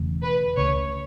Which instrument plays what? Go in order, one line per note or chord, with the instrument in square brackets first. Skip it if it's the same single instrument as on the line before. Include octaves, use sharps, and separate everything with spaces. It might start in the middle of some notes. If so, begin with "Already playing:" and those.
Already playing: [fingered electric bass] E1 E2 C#3 A3
[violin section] B4
[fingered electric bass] C#2 C#3 A3 [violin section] C#5